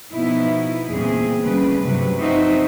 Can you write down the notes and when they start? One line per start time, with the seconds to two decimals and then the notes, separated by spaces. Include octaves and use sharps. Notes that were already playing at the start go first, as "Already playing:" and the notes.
0.13 B2 F3 B3 D#4 E4
0.88 E2 A#2 C#3 G3 C4 G#4
1.41 D2 C#3 G3 B4
1.81 G2 C3 F#3 B4
2.19 F3 C4 D#4 F#4 C5 E5